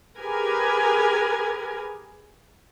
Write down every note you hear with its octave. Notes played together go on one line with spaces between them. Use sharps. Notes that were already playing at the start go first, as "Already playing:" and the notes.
G4 G#4 A#4 B4 G#5